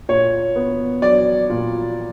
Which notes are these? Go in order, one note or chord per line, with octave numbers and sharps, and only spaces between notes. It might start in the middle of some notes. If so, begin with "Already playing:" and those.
A#2 C#5
B3
F#3 D5
A#2